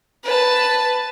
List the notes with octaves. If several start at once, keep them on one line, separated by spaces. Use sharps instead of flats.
B4 A5